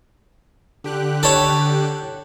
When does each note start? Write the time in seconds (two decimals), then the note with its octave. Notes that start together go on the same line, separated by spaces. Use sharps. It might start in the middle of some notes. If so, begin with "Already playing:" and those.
0.84 D3 G4 F#6
1.23 A4 C#5